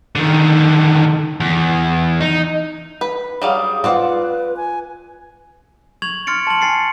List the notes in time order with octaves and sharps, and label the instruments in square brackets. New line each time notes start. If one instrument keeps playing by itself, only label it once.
[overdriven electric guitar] D3 D#3
E2
D#4
[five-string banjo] B4
[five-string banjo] F#3 G3 F5 [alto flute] G#4
[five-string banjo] C4 D5 F#5 [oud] F4 [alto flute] B4
[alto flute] G#5
[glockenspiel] C#6 G#6 F7 F#7
C6 F6 A6 C#7 D7
A5 F#7
G#5 A6 C7 C#7